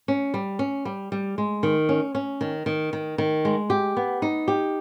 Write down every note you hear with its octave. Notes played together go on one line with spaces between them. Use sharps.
C#4
G3
C#4
G3
G3
G#3
D#3
C#4
C#4
D#3
D#3
D#3
D#3
G#3
G4
B3
D#4
G4